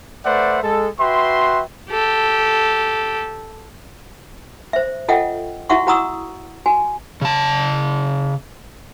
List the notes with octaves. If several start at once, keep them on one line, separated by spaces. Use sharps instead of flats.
A3 B4 C5 D5 E5 F#5
G#3 A4
F#4 B4 E5 G5 C6
G4 A4
C5 E5
F4 A4 D#5 E5 F#5 G5
E4 F#4 E5 F#5 C#6
F#4 F#5 A#5 C#6 D#6 E6
F#4 G#5
C#3 A5